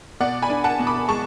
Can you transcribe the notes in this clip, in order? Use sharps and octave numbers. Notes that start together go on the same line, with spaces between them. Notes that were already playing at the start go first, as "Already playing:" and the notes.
B2 D5 F#5
G#5 B5
D4
F#5 A5
B2
B5 D6
G#3 A5 C#6